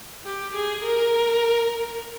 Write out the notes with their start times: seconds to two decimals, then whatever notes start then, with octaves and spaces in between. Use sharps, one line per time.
0.24 G4
0.54 G#4
0.84 A#4